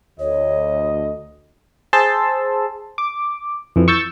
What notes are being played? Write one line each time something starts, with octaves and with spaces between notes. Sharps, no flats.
D2 C#5 D#5
G#4 C5 A5 C6 E6
D6
F2 E3
C#6 E6 G6 A6